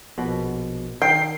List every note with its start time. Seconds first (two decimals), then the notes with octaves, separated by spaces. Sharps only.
0.18 A#1 B2
1.02 D#3 G5 C7